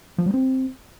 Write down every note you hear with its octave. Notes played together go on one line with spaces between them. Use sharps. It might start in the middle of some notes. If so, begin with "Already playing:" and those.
F3
G3
C4